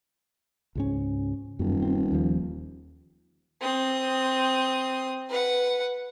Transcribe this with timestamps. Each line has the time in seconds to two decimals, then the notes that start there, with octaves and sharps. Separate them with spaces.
0.75 C#2 G#2 C#4
1.59 D#1 F#2
1.82 C4
2.12 D#2 F3
3.61 C4 D#6
5.29 B4 F#5